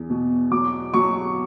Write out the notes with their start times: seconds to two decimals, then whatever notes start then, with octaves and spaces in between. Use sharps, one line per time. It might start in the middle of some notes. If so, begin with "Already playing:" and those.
Already playing: E2
0.10 B2
0.51 F#3 D6
0.94 F#3 C#6